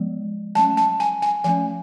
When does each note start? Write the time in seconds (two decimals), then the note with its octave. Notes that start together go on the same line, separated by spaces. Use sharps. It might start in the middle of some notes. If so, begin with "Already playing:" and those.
Already playing: F3 G#3 B3
0.55 F#3 A3 C#4 A5
0.77 A5
1.00 G#5
1.22 G#5
1.44 F3 A3 C#4 G#5